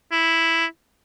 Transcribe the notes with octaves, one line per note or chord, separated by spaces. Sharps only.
E4